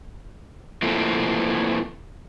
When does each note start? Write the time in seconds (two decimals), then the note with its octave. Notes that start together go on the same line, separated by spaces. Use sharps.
0.82 E3 F3 A3 A#3 C4